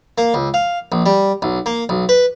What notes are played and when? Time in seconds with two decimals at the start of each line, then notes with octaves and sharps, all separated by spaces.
0.18 A#3
0.34 C#2
0.54 F5
0.92 A#1
1.06 G3
1.42 B1
1.66 A#3
1.89 B1
2.09 B4